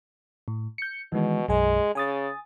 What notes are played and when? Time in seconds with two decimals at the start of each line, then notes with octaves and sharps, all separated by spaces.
0.48 A2
0.78 G6 C#7
1.12 B2 D#3 E3 G#3
1.49 B1 F#2 G#3 G#5
1.95 C#3 G#5 D#6 A6